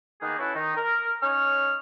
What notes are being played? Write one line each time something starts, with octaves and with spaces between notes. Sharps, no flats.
D#3 A#3 B3 D#4 G#4
C#4 E4 F#4 A4 B4
D#3 D#4
A#4
C#4 D#4 C#5 F6